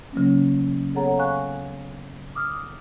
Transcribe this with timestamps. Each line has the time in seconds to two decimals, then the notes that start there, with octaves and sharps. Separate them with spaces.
0.13 C#3 F#3 A#3 C#4
0.94 B3 G#4 A4 C#5 F#5 A#5
1.18 F5 G#5 C#6 F#6
2.35 D6 D#6 F6